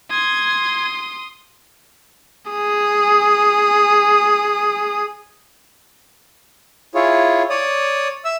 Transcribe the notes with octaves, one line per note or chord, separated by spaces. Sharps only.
C6 D#6 G#6
G#4 D#6
E4 F4 G#4 C#5
C#5 D5 D#6
E5 E6